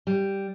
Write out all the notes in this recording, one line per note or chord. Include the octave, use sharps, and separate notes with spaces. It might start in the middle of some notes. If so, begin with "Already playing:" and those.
G3